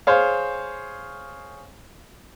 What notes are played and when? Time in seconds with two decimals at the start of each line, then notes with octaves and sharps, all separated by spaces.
0.07 G#4 C5 C#5 F5